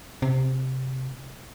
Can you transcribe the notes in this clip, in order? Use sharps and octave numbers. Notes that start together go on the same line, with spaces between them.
C3